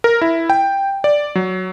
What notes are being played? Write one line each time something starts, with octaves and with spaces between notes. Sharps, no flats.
A#4
E4
G5
D5
F#3